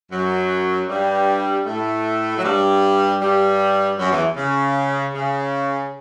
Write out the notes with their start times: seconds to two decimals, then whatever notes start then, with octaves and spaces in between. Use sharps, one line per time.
0.12 F#2 F#3
0.89 G2 G3
1.66 A2 A3
2.37 F#3
2.44 G2 G3
3.21 G2 G3
3.99 F#2 F#3
4.11 E2 E3
4.37 C#3
5.14 C#3